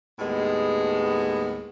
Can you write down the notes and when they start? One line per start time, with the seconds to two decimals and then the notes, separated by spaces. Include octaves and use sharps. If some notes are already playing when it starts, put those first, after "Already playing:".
0.19 D#2 A2 G#3 B3